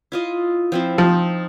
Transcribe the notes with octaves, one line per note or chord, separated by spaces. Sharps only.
E4 F4 D#5
F3 C4 E4
F3 D#4